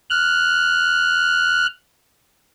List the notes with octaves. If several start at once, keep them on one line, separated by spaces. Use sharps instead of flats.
F6 F#6